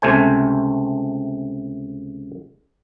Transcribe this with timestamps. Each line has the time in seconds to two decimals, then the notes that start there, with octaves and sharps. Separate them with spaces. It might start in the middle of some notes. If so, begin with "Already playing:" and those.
0.02 C#2 C3 A3 C5 G#5